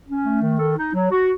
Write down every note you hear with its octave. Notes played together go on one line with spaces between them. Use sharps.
C#4
A3
D#3
A4
D#4
F#3
F#4